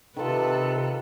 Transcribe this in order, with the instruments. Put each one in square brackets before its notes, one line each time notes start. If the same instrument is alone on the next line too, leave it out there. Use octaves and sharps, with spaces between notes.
[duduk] C3 [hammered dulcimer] D#3 F4 [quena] A4 [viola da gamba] B4